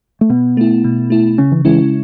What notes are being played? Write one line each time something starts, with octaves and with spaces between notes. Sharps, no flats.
A3
B2 B3
A3 E4
B2
A3 E4
C#3 C#4
E3
E3 G#3 C#4 E4